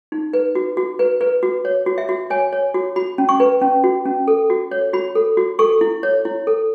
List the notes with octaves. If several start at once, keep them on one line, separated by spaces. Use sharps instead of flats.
D#4
B4
F#4
F#4
B4
B4
F#4
C#5
F#4
E5
F#4
C#5 G#5
C#5
F#4
F#4 B5
C#4
C#6
B4
C#4
F#4
C#4
A4
F#4
C#5
F#4 B5
A4
F#4
A4 C#6
E4
C#5
E4
A4